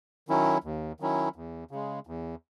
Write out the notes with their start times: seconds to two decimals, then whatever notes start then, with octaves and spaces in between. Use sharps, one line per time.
0.28 D#3 F#3 C#4 E4
0.64 D#2
1.00 D#3 F#3 C#4 E4
1.36 E2
1.71 C#3 G#3
2.07 E2